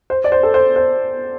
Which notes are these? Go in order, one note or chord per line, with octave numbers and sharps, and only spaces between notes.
C5
D5
C5
A4
C5
C5